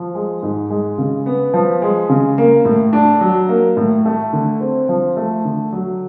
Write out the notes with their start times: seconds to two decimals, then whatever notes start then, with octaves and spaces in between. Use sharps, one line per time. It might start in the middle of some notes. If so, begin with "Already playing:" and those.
Already playing: F3
0.15 G#3
0.43 G#2
0.70 G#3
0.98 C#3
1.26 B3
1.54 F3
1.82 G#3
2.09 C#3
2.38 A#3
2.65 A2
2.93 D4
3.21 F#3
3.49 A#3
3.77 A2
4.05 A3
4.33 D3
4.60 C4
4.89 F3
5.17 A3
5.45 D3
5.72 F#3